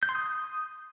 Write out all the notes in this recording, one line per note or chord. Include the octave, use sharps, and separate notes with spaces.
G6
C6
D#6